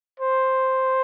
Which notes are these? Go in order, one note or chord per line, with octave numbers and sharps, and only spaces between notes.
C5